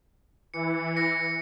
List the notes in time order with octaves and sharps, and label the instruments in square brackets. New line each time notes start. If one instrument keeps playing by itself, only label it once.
[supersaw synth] E3 [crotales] C#7
[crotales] A#6 C#7